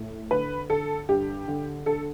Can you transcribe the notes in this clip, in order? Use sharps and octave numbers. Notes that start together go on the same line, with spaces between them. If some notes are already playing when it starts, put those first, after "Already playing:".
Already playing: A2
D3 B4
D3 A4
G2 G4
D3
D3 A4